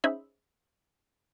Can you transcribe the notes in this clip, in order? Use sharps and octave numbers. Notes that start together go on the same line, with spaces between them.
C#4 D#4 G#4 C5 E5 B5